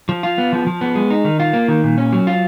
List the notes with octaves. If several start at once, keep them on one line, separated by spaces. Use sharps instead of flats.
F3
F4
B3
F3
F3
B3
G#3
D#4
D#3
F4
A#3
D#3
A#2
C#4
F#3
F4